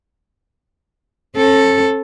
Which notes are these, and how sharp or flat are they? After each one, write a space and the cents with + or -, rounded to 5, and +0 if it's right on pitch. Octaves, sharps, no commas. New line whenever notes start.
C#4 -45 A4 +0